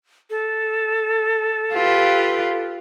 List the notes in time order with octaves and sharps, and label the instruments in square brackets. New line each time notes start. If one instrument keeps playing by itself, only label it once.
[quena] A4
[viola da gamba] F4 G4 B4